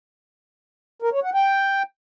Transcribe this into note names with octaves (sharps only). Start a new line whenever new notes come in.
A#4
C#5
F#5
G5